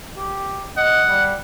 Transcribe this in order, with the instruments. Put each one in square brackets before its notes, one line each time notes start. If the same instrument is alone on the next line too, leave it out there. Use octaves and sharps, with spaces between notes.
[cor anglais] G4
[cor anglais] D#5 [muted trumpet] F#5
[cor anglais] G3